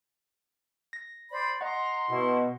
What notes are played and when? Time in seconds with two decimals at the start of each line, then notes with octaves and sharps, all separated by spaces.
0.93 A#6
1.31 C5 D5 B5
1.61 D#5 F#5 A#5 C6
2.09 B2 E4 C#6